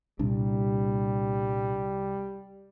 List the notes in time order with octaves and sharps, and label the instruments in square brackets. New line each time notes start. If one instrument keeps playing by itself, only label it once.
[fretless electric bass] C2 [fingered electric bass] A#2 D4 [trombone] G3